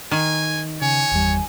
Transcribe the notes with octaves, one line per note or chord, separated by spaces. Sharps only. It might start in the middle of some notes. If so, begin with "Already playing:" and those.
D#3 G#5
C#3 C#5 G#5
G1 E2 G3